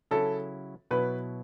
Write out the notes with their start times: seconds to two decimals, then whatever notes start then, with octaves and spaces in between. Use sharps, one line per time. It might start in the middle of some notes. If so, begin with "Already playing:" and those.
0.11 C#3 F#3 C#4 E4 A4
0.91 B2 F#3 B3 E4 B4